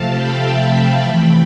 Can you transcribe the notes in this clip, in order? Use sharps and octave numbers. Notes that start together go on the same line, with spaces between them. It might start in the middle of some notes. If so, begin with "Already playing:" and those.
Already playing: C3 F3 A3 C4 F5 A5
G5 B5
E5 G5
E5 G5
C3 E3 A3 G5 B5